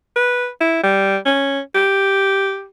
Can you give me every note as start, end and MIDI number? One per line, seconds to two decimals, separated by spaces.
0.16 0.49 71
0.61 0.82 64
0.83 1.17 55
1.26 1.60 61
1.75 2.66 67